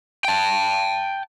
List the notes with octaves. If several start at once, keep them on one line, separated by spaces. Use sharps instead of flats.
G5 A5